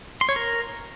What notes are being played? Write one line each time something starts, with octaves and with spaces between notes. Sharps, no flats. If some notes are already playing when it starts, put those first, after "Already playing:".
C6
C#5
A#4